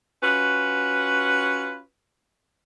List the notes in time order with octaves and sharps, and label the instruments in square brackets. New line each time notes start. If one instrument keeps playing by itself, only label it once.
[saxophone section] C#4 F4 F#4 B4